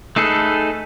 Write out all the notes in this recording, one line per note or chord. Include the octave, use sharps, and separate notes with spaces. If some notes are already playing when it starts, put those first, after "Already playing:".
A3 D#4 G#4 A4 B4